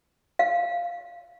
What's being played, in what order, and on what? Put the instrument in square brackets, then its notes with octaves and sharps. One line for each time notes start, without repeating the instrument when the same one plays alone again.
[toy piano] F5